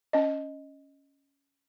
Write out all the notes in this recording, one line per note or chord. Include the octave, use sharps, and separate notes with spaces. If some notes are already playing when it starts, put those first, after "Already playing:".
C#4 D#5